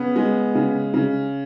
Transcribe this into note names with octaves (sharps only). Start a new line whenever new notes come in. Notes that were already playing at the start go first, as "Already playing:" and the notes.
Already playing: C#3 B3
G#3
C#3
C#3